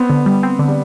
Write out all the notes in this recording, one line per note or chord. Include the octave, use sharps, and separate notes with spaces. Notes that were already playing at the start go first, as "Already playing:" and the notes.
Already playing: B3 C4
D3
G3
C4
D3
G3